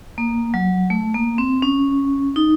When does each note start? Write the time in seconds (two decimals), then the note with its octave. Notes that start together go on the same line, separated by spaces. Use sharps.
0.18 A#3
0.54 F#3
0.90 A3
1.14 A#3
1.38 C4
1.62 C#4
2.36 D#4